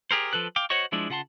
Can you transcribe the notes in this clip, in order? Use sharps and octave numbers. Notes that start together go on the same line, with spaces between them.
G4 G#4 A#4 C5
F3 A4 B4 F#6
F5 G5 D6
F#4 C5 C#5 D#5 C#6
F3 G#3 D4 E4
C#3 F4 F#5 A5 C6